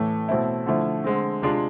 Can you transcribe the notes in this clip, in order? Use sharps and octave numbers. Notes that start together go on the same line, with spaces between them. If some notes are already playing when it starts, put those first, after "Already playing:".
Already playing: A2 E3 A3
B2 A3 C4 E4
D3 F3 A3 E4
D3 G#3 C4
C3 G#3 D4 F4